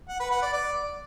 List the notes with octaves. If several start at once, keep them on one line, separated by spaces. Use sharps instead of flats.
F#5
B4
F#5
D5
D5